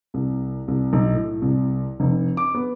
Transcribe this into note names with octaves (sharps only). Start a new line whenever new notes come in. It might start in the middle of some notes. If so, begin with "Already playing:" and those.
C2
C2
B1
A2
C2
F1
D6
B3